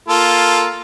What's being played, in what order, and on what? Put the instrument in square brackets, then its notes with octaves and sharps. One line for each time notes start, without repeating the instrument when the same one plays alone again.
[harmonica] A#3 F4 A4